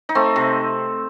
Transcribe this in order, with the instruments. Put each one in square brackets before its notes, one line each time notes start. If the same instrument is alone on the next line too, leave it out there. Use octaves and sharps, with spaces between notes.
[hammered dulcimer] D#4
A3 C4
C3